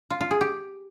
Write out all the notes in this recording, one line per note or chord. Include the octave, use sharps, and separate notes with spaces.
F4
F4
G#4
G4